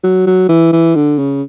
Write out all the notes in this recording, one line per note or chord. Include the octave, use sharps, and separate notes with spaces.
F#3
F#3
E3
E3
D3
C#3